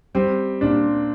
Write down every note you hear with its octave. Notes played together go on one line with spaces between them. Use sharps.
G3 C4
A#2 D4